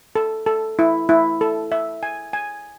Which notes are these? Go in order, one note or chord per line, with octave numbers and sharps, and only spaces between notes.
A4
A4
E4
E4
A4
E5
G#5
G#5